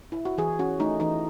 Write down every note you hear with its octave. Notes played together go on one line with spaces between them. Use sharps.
E4
F#4
E3 G#4
C#4 F#4
A3 D#4
E3 D#4